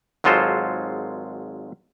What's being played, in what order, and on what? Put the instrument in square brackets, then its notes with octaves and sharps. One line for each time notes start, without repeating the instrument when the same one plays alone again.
[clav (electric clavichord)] G#1 F#3 G#3 F4 A4 C5